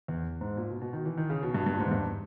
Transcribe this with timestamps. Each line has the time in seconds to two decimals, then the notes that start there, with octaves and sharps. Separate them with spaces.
0.08 E2
0.41 G#2
0.57 A#2
0.70 B2
0.82 B2
0.93 D#3
1.05 E3
1.17 D#3
1.30 C#3
1.43 B2
1.54 G2
1.66 G2
1.74 A#2
1.79 G#2
1.86 E2
1.91 G2